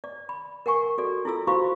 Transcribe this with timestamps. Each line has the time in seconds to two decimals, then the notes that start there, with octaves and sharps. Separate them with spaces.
0.04 D5
0.29 B5
0.66 A#4 F#5 G#5 C#6
0.98 F#4 A4 D5
1.25 E4 F4 A4 E6
1.47 E4 F#4 C5 F5 B5 C#6